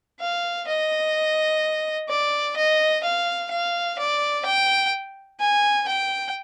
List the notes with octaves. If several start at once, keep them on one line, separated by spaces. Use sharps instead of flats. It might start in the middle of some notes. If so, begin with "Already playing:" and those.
F5
D#5
D5
D#5
F5
F5
D5
G5
G#5
G5